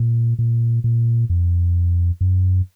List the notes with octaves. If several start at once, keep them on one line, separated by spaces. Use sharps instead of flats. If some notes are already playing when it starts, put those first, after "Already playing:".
Already playing: A#2
A#2
A#2
F2
F#2